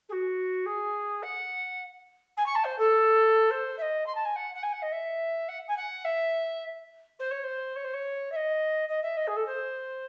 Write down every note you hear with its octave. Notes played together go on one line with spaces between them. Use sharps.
G#4
F#4
G#4
F#5
G#5
C#6
A5
C5
A4
C5
E5
D#5
C6
A5
G#5
F#5
F#5
G#5
F#5
D#5
E5
F#5
G#5
F#5
E5
C5
C#5
C5
C#5
C5
C#5
E5
D#5
D#5
E5
D#5
G#4
A4
C5